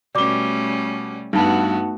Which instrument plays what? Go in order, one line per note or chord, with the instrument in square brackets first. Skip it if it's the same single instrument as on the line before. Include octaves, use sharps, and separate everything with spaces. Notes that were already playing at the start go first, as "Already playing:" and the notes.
[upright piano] B2 G7 [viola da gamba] G3 A3 C#4 [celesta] D5 D6
[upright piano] G2 [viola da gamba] A3 B3 F#4 [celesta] D#4 A5